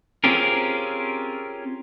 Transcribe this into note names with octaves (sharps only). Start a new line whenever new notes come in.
C4 C#4 F4 G4 G#4 A#4